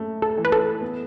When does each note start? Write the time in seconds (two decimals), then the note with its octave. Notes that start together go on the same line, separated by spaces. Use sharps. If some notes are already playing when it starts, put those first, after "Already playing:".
Already playing: F#2 A3
0.22 A4
0.37 E3
0.45 B4
0.52 A4
0.81 B3